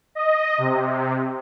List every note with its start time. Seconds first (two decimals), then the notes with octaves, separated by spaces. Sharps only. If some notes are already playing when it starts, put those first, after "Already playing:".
0.15 D#5
0.58 C3